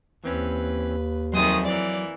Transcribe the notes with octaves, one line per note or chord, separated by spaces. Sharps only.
D#2 E3 C4 C#4 B4
F2 D#3 F#3 G#3 A3 C6 D#6
E3 A#3 D5